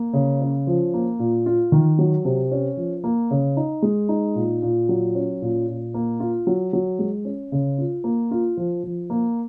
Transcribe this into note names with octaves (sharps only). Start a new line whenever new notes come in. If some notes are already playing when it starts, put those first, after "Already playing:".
Already playing: A#3
C#3
C#4
F3
A#3
A#2
F4
D#3
F#3
C3
C#4
F3
A#3
C#3
D#4
G#3
D#4
A#2
A#2
F#3
C#4
A#2
A#2
A#3
F4
F#3
F#3
G#3
C#4
C#3
F4
A#3
F4
F3
F3
A#3